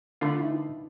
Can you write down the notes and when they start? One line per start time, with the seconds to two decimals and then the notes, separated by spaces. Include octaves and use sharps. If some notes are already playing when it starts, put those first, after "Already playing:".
0.21 D3 A3 D4 F4 B5
0.39 D#4 E4